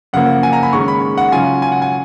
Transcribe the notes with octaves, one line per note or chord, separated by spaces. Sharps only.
F#2 C#3 F3 A#3 F#5
G#5
A#5
B5
G#2 D#3 G#3 C#4 C#6
B5
F#5
C#3 F#3 C#4 F4 G#5
G#5
F#5
G#5